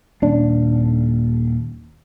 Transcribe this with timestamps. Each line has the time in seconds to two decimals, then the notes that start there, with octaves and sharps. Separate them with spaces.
0.22 D#1 D4